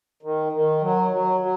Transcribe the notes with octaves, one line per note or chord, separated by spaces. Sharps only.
D#3
D#3
F#3
F#3
F#3